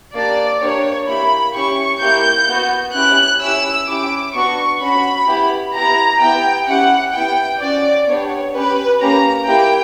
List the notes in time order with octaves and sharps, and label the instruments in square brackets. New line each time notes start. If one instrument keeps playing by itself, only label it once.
[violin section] A#3 D4 G4 D5
A#3 D4 G4 C#5
A#3 E4 G4 B5
C#4 E4 G4 C#6
A#3 E4 G4 G6
B3 F#4
C#4 E4 G4 F#6
C#4 E4 G4 E6
C#4 E4 G4 D6
B3 D4 F#4 C#6
C#4 F#4 B5
B3 E4 G4
B3 E4 G4 A#5
B3 E4 G4 G5
C#4 E4 G4 F#5
B3 E4 G4 G5
C#4 F#4 D5
B3 D4 G4 C#5
C#4 G4 B4
A#3 C#4 G4 A#5
A#3 E4 G4 G5